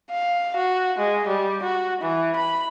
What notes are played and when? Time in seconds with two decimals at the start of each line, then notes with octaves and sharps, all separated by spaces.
0.11 F5
0.56 F#4
0.98 G#3
1.27 G3
1.63 F#4
2.02 E3
2.36 B5